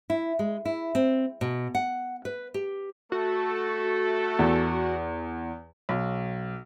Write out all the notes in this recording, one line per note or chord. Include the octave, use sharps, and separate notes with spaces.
E4
G#3
E4
C4
B2
F#5
B4
G4
A3 F#4 A4
E2
B1